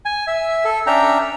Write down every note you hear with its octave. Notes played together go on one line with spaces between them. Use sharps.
G#5
E5
A4
C#4 D4 E5 G5 A#5